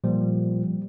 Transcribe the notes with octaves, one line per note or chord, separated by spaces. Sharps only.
A#2 F3 G3